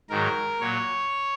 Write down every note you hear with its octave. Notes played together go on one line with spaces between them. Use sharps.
G#2 D#3 F#3 A#4
A#2 F#3 C#5